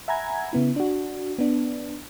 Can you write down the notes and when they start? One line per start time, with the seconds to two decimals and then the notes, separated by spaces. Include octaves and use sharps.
0.08 E5 F#5 G#5 A#5 B5 G#6
0.53 C#3 B3 E4
0.76 D4 F#4
1.39 B3 D4